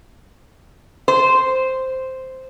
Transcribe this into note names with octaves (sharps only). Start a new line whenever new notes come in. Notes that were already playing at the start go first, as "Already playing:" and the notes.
C5